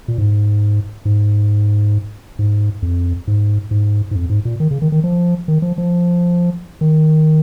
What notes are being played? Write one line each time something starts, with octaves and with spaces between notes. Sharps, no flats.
A#2
G#2
G#2
G#2
F2
G#2
G#2
G#2
F2
G#2
A#2
D#3
C#3
D#3
D#3
F3
D#3
F3
F3
D#3